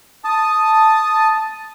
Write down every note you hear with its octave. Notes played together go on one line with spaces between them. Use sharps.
A5 D#6